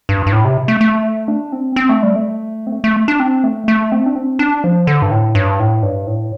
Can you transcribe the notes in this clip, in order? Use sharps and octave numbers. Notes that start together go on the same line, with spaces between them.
G2
G2
A2
C3
A3
A3
D4
C4
C4
A3
G3
A3
C4
A3
A3
D4
C4
A3
A3
C4
D4
C4
D4
F3
D3
G2
A2
G2
A2
G2
A2